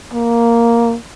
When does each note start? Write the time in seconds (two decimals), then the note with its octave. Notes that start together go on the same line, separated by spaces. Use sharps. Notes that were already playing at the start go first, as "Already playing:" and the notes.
0.14 A#3